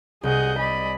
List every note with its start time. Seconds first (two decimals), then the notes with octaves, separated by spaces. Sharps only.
0.23 C2 G#4 D#5 F#5 G6
0.59 D5 D#5 G#5 B5